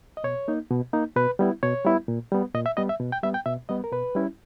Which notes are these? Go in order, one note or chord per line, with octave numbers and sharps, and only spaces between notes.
D#5
B2 C#5
A#3 D#4
B2
A#3 D#4
B2 B4
G3 B3 E4
B2 C#5
G3 B3 E4
A#2
G3 B3
A#2 D#5
E5
G3 B3 D#5
E5
B2
G5
G3 B3 E5
G5
B2 E5
G3 B3 D#5
A#4
B2 B4
G3 C#4 E4